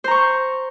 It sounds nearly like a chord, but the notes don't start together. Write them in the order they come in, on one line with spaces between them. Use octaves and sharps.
C5 A#5 C#6